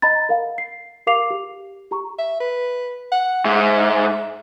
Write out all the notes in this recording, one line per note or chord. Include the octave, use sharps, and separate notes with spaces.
D#5 A#5 B5 A6
A#4 F5 F#5
C7
G4 A#4 F5 D6 C7 F7
G4
G4 A#5 C#6
E5
B4
F#5
G#2 E5